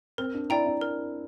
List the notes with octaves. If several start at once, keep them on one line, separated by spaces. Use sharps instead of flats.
C4 A#4
D4
E4 D5 G5 A#5
E4
A#4